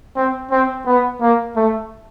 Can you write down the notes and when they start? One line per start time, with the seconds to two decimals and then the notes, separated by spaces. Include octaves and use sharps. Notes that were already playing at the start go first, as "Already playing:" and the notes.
0.16 C4
0.51 C4
0.87 B3
1.21 A#3
1.56 A3